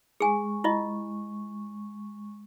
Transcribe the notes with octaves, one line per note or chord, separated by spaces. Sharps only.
G#3 G#4 G#5 C#6
E4 F4 D#5